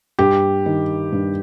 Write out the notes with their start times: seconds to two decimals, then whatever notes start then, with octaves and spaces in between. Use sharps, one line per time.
0.19 G2 G4
0.66 D#3
1.12 G2